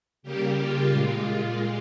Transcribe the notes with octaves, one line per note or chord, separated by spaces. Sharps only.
C#3 G3 A#3 G4
F4
A#2 G#3